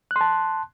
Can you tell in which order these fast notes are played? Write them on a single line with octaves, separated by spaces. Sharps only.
F#6 C6 A5